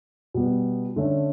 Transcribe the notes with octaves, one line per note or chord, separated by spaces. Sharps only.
B2 G3 B3
D3 A3 C#4